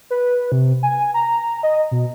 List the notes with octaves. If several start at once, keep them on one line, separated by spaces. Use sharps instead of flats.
B4
C3
G#5
A#5
D#5
B2